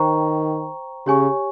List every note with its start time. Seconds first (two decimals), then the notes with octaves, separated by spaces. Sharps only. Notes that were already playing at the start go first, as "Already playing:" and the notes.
Already playing: D#3 C5 G5 A#5 C#6
1.06 C#3 G4 C#5 G#5 C#6